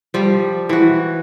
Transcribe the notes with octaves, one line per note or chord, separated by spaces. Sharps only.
F3 G3
E3 F#4